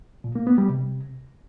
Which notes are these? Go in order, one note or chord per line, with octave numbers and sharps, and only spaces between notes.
A#2
A#3
B3
G3
C3